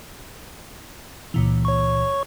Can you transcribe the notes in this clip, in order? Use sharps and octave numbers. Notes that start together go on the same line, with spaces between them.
C#2 A#2 E3
C#5 C#6